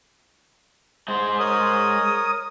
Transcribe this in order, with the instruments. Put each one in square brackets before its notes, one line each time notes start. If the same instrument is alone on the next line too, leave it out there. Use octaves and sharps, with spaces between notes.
[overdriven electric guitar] G#3 C5
[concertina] A#4 C#5 [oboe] D#6